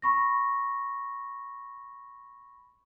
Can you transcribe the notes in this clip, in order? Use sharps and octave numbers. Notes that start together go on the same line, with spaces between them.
B5 C#6 A#6